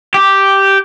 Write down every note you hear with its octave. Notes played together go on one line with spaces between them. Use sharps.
G4